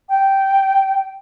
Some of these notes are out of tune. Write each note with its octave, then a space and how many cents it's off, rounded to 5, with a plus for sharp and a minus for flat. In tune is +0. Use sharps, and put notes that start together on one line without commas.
G5 -10